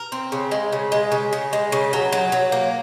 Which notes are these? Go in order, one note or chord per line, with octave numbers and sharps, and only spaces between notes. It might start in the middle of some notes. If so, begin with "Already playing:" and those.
Already playing: A#4
C4
C#3
G#3
C#3
G#3
C#3
C#3
G#3
C#3
F#3
F#3
F#3
A#3